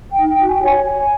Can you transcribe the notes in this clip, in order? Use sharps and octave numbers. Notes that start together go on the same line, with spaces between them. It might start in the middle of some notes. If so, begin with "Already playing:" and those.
G5
D#4
G5
F#4
G#5
G5
C#5 G#5
C#5